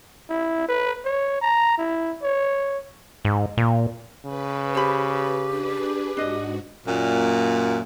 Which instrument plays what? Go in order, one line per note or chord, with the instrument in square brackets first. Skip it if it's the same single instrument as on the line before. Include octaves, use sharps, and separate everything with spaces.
[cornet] E4
B4
C#5
A#5
E4
C#5
[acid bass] G#2
A#2
[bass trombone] C#3 [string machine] B4
[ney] G4 [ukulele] C5 B5
[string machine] D4 G#4 B4
[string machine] G#2 F#4 [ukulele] D4 D#5
[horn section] F#2 A#2